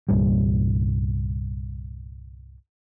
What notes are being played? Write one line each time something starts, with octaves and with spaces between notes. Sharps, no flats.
C2 G2 A#2 G3